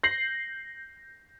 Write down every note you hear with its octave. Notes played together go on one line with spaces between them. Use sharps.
G6 A#6 C7 F#7